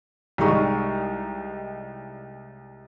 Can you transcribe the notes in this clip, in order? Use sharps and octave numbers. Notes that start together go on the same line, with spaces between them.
C2 G3 G#3 D#4 C#6 D#6